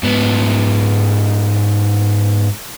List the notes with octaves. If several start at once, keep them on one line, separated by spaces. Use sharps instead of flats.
G#2 B3